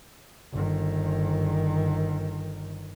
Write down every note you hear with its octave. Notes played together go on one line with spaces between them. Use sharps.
G1 D#3